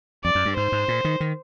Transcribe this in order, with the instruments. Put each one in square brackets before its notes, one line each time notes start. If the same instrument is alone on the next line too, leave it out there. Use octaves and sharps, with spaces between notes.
[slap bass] F2 [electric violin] D5
[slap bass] F#2
G2
[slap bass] G#2 [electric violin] C5
[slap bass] G#2
A#2
D#3
D#3